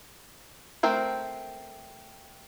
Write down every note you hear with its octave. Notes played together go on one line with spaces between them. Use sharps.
A3 C4 A#4 C5